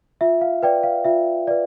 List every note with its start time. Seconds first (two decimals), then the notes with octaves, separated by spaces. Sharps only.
0.21 F4 E5
0.41 F5
0.63 B4 D5 G5
0.83 F5
1.04 F4 E5
1.47 B4 D5